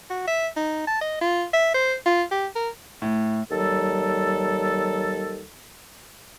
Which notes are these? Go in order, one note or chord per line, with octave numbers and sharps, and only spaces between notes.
F#4
E5
D#4
A5
D#5
F4
E5
C5
F4
G4
A#4
A2
D#2 F#3 G3 A4